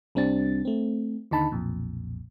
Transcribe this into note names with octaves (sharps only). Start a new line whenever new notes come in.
C2 G3 C4 D4 A6
A3 C4
D#2 D3 D#4 A5 B5
B1 F2 A#2